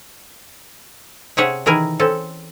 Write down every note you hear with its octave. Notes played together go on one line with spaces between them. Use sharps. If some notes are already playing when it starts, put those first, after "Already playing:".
C3 C#4 G#4 C#5 E5 F#5
D#3 E3 E4 G#4 A#4 G#5
C4 C#4 A4